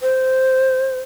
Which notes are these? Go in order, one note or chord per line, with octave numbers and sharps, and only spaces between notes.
C5